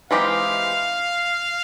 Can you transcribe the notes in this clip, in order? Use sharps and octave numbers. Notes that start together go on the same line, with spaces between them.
E3 G#3 C4 D#4 G4 F5